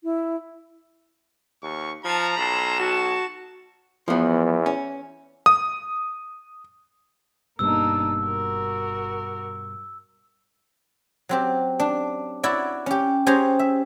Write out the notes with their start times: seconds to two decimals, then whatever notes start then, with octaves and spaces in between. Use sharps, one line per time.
0.04 E4
1.63 D#2 C#6
2.04 F3 A5 A#5 G#6
2.38 B1 A5 B5 C6 E7
2.80 F#4 A5
4.08 E2 F3 B3
4.66 C#4
5.46 D#6
7.59 G1 G2 B2 A#3 D4 D#4 E6
8.23 F#4 A#4
11.29 F#3 C4 G4
11.80 D4
12.44 E4 F#4 C#5 D5
12.86 C#4 G4
13.26 C#4 G4 G#4 C5 G#5 A#5
13.59 E5